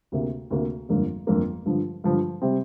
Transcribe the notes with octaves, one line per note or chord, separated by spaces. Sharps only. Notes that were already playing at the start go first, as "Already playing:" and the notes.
D2 C3 A#3
D2 C3 A#3
G1 F2 D3 A#3
G1 F2 D3 A#3
G2 D3 F3
G2 D3 F3
C3 G3 C4